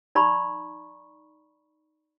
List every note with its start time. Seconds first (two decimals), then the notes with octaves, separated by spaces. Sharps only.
0.15 D#4 D5 A#5 B5 C#6